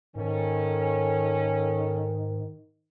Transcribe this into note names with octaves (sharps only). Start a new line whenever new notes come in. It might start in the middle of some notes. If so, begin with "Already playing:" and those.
G#2 D#3 C#4 A4